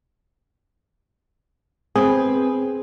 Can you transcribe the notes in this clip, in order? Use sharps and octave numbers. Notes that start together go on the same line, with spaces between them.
C4 G#4 B4